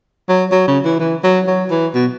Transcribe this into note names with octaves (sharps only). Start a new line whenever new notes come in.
F#3
F#3
C#3
E3
E3
F#3
F#3
E3
B2